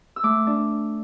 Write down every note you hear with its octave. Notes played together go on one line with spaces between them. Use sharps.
E6
A3 D6
D4